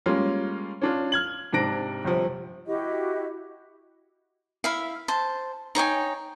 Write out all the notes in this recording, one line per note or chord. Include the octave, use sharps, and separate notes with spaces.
G3 G#3 A#3 C#4 F4
C#4 D4 F4
F6 G#6 F#7
G#2 C3 D4 A#6 D7
G1 C3 F3
E4 F#4 G4 D#5
E4 E5 F5
C5 A5
D#4 C#5 G5 G#5